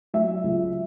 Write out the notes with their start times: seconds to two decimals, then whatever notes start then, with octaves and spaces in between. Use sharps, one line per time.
0.14 F#3 E5
0.44 C#2